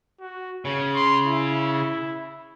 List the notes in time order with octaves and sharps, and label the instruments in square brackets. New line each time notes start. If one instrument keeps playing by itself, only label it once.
[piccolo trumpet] F#4
[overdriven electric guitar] C#3 [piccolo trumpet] C#5
[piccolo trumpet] C6
E4